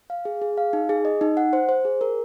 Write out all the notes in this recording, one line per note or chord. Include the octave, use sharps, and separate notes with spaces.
F5
G#4
G#4
F5
D#4
G#4
D#5
D#4
F#5
C5
C5
G#4
A#4